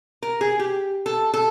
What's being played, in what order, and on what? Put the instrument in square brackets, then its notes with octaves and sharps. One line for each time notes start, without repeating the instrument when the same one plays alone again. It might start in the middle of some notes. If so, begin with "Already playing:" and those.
[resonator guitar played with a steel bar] A#4
G#4
G4
A4
A4